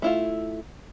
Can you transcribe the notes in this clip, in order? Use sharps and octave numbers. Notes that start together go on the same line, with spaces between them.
A3 E4 F4